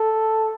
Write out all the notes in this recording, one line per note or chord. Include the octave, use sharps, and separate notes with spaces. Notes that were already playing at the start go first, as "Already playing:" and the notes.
Already playing: A4